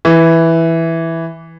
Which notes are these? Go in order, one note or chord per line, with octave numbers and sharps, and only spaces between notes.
E3